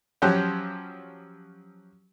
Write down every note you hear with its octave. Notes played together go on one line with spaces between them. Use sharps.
F3 F#3 C#4 F#4 G4 C5